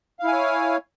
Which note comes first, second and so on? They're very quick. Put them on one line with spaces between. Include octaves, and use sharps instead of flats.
F5 E4 G#5 C#5